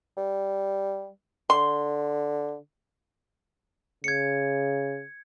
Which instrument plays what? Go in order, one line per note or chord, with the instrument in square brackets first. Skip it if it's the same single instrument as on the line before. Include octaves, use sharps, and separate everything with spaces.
[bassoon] G3
[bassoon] D3 [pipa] C6
[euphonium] C#3 [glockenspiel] G#6 C#7